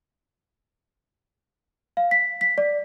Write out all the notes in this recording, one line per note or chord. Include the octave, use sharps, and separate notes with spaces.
F5
B6
B6
D5